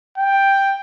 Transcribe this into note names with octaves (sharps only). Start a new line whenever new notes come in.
G5